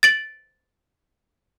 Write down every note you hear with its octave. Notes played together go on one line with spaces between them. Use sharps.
A6 D7 F#7